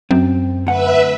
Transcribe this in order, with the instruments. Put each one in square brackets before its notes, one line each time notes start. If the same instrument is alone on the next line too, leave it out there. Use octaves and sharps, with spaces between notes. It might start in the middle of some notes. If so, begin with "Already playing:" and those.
[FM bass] F#2 [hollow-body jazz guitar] C4
[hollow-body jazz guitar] D2 F#5 [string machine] B4 E5